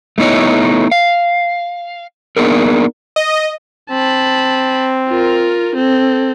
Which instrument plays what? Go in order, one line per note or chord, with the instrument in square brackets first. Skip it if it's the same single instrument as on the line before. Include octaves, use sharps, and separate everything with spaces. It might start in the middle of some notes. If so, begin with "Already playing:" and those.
[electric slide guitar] A3 B3 D#4 E4 C#5
F5
A#3 B3 D4 D#4 G#4 A#4
[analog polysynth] D#5
[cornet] C4 [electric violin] A5 B5
[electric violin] F4 A#4
C4 A4